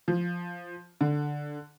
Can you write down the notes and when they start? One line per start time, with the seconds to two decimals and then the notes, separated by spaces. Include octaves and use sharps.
0.08 F3
1.01 D3